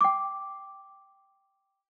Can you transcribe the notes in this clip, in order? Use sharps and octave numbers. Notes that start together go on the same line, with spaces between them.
G5 D6